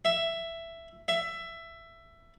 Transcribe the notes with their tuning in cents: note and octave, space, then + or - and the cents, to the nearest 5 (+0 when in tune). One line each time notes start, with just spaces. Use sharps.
E5 +10
E5 +15